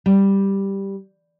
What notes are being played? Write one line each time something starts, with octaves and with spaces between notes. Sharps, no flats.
G3